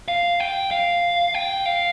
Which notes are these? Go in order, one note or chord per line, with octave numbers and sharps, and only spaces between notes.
F5
G5
F5
G5
F5